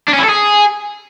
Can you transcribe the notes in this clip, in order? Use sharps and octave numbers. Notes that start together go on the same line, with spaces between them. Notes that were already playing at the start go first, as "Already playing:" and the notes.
D4
C#4
E4
A4
G#4